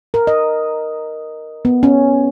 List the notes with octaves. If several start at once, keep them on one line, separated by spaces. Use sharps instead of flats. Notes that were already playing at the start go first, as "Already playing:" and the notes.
A#4
D#5
B3
C#4